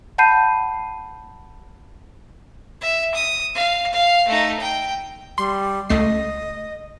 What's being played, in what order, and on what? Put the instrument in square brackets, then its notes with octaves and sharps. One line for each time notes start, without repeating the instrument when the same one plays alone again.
[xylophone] F#5 A5 B5 G6 C7 D#7
[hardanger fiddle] E5
D#6
F5
F5
A3 D#4
G5
[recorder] G3 [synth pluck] C6
[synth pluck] C#2 A3 C7 [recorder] D#5